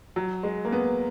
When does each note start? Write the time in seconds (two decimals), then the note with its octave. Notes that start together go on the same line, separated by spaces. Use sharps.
0.16 F#3
0.43 G#3
0.65 A#3
0.72 B3